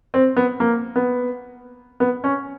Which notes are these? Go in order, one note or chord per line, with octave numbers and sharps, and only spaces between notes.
C4
B3
A#3
B3
B3
C#4